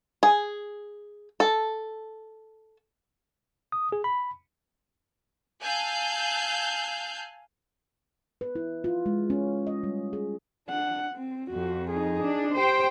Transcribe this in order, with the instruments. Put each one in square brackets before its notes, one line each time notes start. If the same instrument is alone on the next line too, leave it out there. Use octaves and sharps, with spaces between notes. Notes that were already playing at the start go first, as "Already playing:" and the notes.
[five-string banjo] G#4
A4
[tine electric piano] D#6
G#4
B5
[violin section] F5 G#5 A5 E6 F#6 G6
[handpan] B4
E4
F4
G#3
C#4
D#5
G3
G#4
[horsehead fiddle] D4 F#5
C4
[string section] F2 [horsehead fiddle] F#4
[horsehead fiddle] D#4 G#4
[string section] D4
[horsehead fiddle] G4 [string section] C5 G5